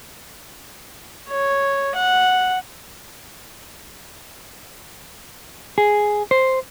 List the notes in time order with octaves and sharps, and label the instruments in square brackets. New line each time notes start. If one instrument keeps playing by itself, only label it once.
[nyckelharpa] C#5
F#5
[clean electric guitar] G#4
C5